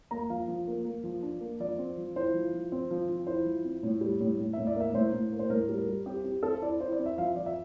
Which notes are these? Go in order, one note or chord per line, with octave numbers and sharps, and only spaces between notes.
A#3 A#5
F3 F5
F3
A#3
A#3
F3
D4
A#3
F3 D5
C4
F3
E4 C5
F3
F3
C4
F3
F3
E4 C5
F3
C4
A2
G3
A2
A2
A2 E5
D5
A#3 E5
A2 C5
A2
A#3
C5
A2 A#4
G3
A#4
G3
C4 G4
C4 G4
C4 A4
E4 D5
E4 C5
D5
C4
E5
F3 F5
F3 D5
E5